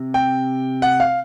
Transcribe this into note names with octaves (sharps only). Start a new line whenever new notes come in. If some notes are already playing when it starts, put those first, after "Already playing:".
Already playing: C3
G5
F#5
F5